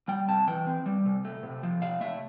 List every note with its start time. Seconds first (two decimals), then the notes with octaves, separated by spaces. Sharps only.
0.08 G3 G5
0.28 C3 A5
0.47 E3 G5
0.67 C4
0.86 G3
1.06 C3
1.25 A3
1.43 C3
1.63 F3
1.82 C3 F5
2.01 A3 E5